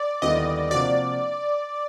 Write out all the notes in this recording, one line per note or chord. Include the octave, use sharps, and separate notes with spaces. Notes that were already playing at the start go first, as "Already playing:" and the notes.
Already playing: D5
D#2 D3 G3 B3 E4 D#5
C3 F3 A#3 D4 F#4 D5